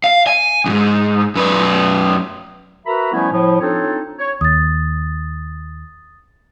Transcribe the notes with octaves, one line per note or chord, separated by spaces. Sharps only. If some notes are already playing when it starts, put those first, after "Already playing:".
F5
G#5
F2 G#2
F#2 B4
F#4 A#4 B4 E5 A#5 B5
F3 G3 A3 B3 C#4 E4
A2 F3
C4 D4 D#4 F4 A4 C#5
C#5
D#2 D#6 A6